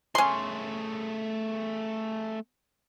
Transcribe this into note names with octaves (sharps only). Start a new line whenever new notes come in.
A3 C#4 G#4 C6